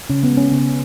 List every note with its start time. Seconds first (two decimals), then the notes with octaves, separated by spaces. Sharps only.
0.10 C#3 C#4
0.23 B3
0.31 G#3
0.37 C#4
0.51 C#3 B3